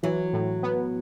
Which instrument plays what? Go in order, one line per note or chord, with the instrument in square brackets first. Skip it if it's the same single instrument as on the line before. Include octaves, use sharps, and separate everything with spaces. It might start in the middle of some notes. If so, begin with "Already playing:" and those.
[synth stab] E3 [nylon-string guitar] F#3
[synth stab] A2
B3